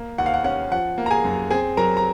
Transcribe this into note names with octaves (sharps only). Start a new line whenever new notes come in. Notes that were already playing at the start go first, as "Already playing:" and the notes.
Already playing: A#3
D#2 F#5
F5
F#5
C#4 F#5
F3 F#5
A#3
A#5
G#4 G#5
F#2
C4 G#4 G#5
F#3 A#4 A#5
A#5